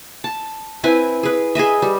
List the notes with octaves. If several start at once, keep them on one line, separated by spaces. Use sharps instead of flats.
A5
C4 E4 B4 G#5
G#4 B4
G#4 B4 D#5 E5
G3